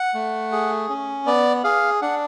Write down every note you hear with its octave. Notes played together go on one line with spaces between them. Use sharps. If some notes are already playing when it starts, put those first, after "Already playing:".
Already playing: F#5
A3
G#4
C#4
B3 D5
G#4 F5
D4 F#5